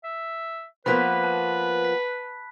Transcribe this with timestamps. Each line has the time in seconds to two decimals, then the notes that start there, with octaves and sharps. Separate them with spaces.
0.04 E5
0.86 F3 A#3 B3 B4 B5 F#6 B6
1.24 A5
1.84 B6